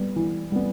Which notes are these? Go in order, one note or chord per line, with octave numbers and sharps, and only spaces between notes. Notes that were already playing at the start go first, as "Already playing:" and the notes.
Already playing: G3 B3
E3
G3 B3